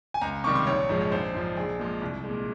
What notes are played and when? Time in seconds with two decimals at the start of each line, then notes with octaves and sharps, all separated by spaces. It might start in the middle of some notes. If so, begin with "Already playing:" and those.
0.14 G#5
0.21 C#2 A#5
0.44 C3 D#3 G3 C#6
0.55 C6
0.67 A#1 C#5
0.89 G#2 F3 G#3
1.01 C#5
1.12 A#1 C5
1.34 G#2 F3
1.57 A#1 G#4
1.79 A#2 F3 G#3
2.02 C2
2.24 A#2 G#3